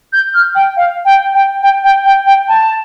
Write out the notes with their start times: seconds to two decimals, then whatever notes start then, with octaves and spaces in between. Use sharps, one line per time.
0.13 G6
0.34 F6
0.55 G5
0.77 F5
1.05 G5
1.34 G5
1.63 G5
1.84 G5
2.05 G5
2.27 G5
2.48 A5